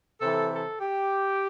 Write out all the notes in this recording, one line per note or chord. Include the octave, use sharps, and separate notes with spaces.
C3 E3 A4
A4
G4